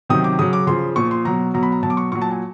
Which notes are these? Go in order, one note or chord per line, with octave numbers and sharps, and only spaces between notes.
C3 D#3 F#3 D#6
D6
C#3 F#3 D#6
D6
C#3 F3 C6
A#2 F3 C#6
C6
B2 F#3 A#5
B2 F#3 A#5
B5
A#5
B2 F#3 A5
D6
C#6
A#2 F#3 C#6
A5
G#5